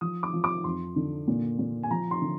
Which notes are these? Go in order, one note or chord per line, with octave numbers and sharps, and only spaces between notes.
F3 D#6
D6
F3
D6
F2 C6
D3
A#2
A#2
G#5
F3 A#5
C6
D3